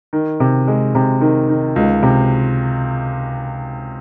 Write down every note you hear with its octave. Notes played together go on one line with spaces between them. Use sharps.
D#3
C3
G#3
C3
D#3
D#3
C#2
C3